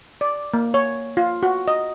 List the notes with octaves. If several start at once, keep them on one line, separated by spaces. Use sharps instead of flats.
D5
A#3
C#5
F4
F#4
D#5